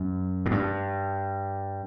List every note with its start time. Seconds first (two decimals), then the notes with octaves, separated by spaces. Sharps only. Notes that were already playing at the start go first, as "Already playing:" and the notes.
Already playing: F#2
0.46 A2
0.51 G2